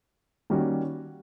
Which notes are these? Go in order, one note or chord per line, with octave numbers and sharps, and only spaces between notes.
D#3 G3 A#3 C#4 F#4